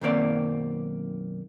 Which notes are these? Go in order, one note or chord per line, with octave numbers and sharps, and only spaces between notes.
B1 F#2 D#3 A#3 C4 D5